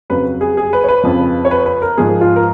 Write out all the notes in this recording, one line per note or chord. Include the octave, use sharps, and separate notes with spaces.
F2 C#3 F#3 B4
G#4
G#4
B4
C#5
B4
F2 C#3 F3
C#5
B4
B4
A#4
G#2 F3 G#4
F4
A#4